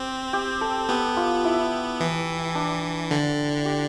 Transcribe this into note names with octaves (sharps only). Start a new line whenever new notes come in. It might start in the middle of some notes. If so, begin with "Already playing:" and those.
Already playing: C4 G4
G4
A4
B3 G4
F4
E4
E3
D4
D3
G4